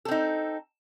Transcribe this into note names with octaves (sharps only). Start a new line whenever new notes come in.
C4 D#4 A4